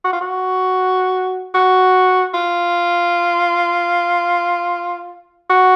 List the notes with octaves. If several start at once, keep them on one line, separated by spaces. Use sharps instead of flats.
F#4
F4
F#4
F#4
F4
F#4